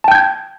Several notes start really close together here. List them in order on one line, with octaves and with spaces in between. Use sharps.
A5 G5 G6 G#6